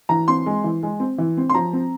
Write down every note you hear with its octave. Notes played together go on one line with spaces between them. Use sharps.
E3 A#5
C4 C6
G#3
E3
G#3
C4
E3
C4
C6
F3 A#5
C4